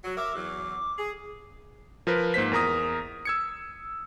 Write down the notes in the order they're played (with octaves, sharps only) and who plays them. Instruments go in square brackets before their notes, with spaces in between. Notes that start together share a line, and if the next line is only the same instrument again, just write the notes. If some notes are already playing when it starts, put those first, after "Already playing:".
[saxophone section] F#3
[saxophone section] A#4 E5 [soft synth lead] D6
[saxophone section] E2 F#3
G#4
[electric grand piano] F3 A#4 B4
G#2 A#3 C5 B6
E2 A#4 A#5 D#6
E6 G#6 C#7